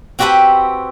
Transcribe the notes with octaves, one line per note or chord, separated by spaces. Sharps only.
C4 F#4 G4 A4 B4